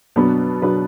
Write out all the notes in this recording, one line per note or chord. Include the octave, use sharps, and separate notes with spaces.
B2 F#3 B3 D4 B4
B2 F#3 B3 D4 B4